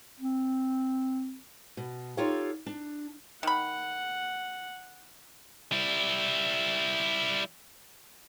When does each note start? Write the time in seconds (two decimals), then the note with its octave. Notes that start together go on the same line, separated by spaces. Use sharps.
0.20 C4
1.77 B2
2.17 D#4 F4 G4 A4 C#5 F5
2.66 D4
3.43 D#3 F#5 B5
5.72 G3 E4